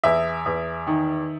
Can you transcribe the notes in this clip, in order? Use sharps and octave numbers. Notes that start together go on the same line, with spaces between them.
E2 E5
E2
D#3